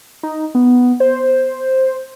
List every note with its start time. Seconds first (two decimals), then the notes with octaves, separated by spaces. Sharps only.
0.23 D#4
0.55 B3
1.00 C5